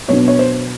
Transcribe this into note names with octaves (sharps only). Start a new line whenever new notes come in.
B2 F#3 B3 D4 C#5
C#5
C5